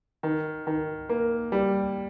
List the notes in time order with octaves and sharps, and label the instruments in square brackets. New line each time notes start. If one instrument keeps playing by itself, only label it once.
[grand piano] D#3
D#3
A#3
G3